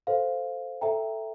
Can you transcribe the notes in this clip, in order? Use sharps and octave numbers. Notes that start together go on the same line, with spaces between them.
A4 C5 F5
A4 E5 G5 A#5